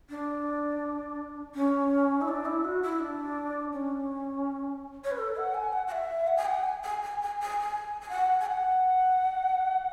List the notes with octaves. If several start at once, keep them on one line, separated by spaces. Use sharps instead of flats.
D4
C#4
E4
D4
E4
F#4
E4
D4
C#4
C#5
B4
A4
F#5
G#5
F#5
F#5
E5
F#5
G#5
F#5
G#5
G#5
G#5
G#5
G#5
G#5
G#5
F#5
G#5
F#5